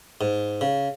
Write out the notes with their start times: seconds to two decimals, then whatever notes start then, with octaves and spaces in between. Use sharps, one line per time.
0.21 G#2
0.61 C#3